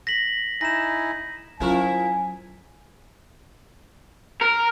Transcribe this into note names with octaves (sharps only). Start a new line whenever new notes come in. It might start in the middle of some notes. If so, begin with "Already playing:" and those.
A#6 B6 F#7
D#4 E4 G#5 A#6 E7
F3 F#3 C#4 E4 F4 A#4 G#5 C#6
A#4